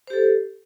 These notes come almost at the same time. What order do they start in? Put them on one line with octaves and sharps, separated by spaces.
C5 G4 A4